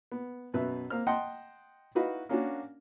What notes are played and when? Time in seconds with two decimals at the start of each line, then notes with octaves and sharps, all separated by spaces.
0.12 B3
0.54 F#2 B2 B4 E5
0.90 A#3 C4 F6
1.07 D#5 F#5 G5 A5 C6
1.95 D#4 E4 F#4 B4 D#5 F5
2.29 A#3 C#4 D4 F#4